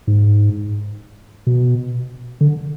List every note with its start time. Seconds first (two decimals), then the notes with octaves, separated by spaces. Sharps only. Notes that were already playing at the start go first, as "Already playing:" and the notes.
0.07 G#2
1.47 B2
2.41 D3